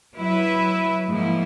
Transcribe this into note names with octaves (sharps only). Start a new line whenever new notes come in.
F#3 E4 B4 E5
G#2 F3 A#3 E4